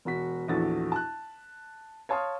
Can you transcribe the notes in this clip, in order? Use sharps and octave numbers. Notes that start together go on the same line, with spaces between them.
E1 F#4 B6
A#1 E2 F#4 A4 A6
A5 F#6
C#5 F5 A5 C6 D#6 F6